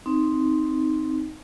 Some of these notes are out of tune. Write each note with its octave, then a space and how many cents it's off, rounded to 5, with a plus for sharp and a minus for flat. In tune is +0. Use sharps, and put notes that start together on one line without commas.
C4 +0 D#4 +5